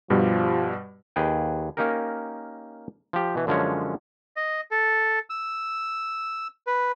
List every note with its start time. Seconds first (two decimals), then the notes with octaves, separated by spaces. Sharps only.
0.10 G2 B2 F3 G3
1.16 D#2 G#4 B4 G5
1.77 A#3 C#4 D#4 G4 A#4
3.13 F3 G4
3.35 B2 E3
3.47 F#2 D3 F3 G#3 C#4 C#5
4.37 D#5
4.71 A4
5.30 E6
6.67 B4